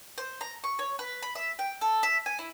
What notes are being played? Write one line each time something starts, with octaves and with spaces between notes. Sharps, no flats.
C5
A#5
C#6
C#5
B4
B5
E5
G5
A4
E5
G#5
E4